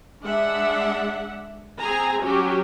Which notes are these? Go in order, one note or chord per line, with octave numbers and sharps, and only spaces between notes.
G#3 D4 E5 F#5
C4 G#4 G#5 A#5
F#3 C#4 F#4 G4